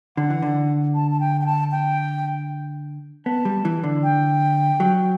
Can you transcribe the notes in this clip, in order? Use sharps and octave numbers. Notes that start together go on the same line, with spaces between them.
D3 F#5
E3
D3
A5
A5
G5
G5
A5
G5
B3 A5
G3
E3
D3
G5
F#3